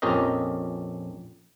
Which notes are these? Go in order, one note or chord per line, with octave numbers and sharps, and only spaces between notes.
A#1 F2 C#4 G4 A#4 D#5